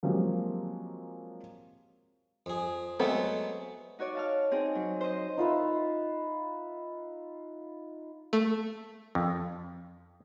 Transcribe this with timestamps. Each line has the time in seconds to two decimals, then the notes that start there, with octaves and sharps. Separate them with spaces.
0.03 F3 F#3 G#3 A#3 C4 G4
2.46 F2 G#4
3.00 F#3 G#3 A3 B3 C4 A4
3.99 D#4 F#4 C#5 D5
4.15 F5 A5 F6
4.51 C4 D#4 G#4
4.75 F#3
5.01 C5 D#5
5.37 D#4 F4 B4 E5
8.33 A3
9.15 F2